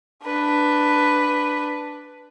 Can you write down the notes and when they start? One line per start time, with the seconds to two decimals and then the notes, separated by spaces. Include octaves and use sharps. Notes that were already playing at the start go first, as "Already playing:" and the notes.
0.24 D4 B4